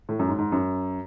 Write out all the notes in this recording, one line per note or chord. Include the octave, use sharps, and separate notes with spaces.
A2
F#2
G#2
G#2
F#2